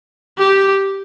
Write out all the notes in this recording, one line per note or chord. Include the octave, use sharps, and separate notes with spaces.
G4